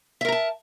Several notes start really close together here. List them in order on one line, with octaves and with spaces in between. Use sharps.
E5 A#4 A#5 A5